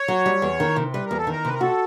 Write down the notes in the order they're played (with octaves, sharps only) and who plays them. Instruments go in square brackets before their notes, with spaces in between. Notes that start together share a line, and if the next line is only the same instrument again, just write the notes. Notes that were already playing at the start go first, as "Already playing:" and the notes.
Already playing: [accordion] C#5
[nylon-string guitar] F#3
G3
E2
D#3
C3
[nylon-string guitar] G3 [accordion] B4
[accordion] A#4
[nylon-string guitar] E2
[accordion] A4
[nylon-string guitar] D#3 [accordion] A#4
[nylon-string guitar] C3 [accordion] B4
[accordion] A#4
[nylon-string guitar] F#4 [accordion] A4